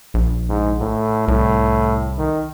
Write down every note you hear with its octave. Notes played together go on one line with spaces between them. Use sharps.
A#1
G#2
A2
C2 A2
D#3